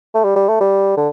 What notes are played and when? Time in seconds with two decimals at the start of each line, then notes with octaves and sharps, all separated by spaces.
0.14 A3
0.24 G3
0.36 G3
0.49 A3
0.61 G3
0.97 D3